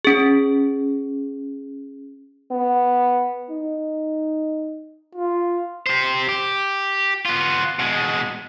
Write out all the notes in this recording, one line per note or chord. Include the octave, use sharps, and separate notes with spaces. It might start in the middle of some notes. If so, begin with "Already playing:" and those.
C#4 G#4
B3
D#4
F4
G4 C5
G4
B3 F4
B2 G#3